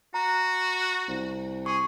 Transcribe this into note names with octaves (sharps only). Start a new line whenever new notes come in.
F#4 A#5
C2
G#4 C#6